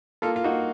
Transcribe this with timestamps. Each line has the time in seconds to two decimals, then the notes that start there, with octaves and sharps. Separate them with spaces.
0.22 A#3 F4 A4
0.36 F4
0.44 A#3 D#4 F#4